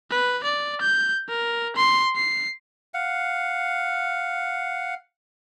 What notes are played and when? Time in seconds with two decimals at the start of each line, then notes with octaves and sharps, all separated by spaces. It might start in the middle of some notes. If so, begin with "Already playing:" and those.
0.10 B4
0.44 D5
0.81 G6
1.29 A#4
1.76 C6
2.16 C7
2.94 F5 F#5